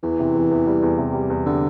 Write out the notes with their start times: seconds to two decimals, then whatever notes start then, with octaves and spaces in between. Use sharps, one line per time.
0.03 E2 E3
0.19 C3
0.35 E2
0.51 E2
0.67 G3
0.83 E2
0.98 C3
1.14 G3
1.30 E2
1.46 D3 G3